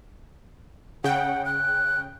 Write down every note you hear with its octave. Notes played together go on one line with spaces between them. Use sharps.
C#3 F#5 G5
F#6